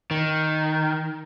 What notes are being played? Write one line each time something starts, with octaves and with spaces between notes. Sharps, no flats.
D#3